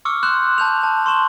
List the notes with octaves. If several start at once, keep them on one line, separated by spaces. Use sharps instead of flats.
C#6 D6 E6 F6 C#7
C6 E6 F#6 G6 E7 F#7
E6
A5 G6 F7
A5
C6 C#6 E7 F#7